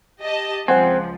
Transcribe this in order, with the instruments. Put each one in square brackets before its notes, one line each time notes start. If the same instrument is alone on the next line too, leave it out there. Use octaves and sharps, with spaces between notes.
[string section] G4 D#5 A5
[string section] C#2 F3 [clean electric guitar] C4 [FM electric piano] C5 F#5 G#5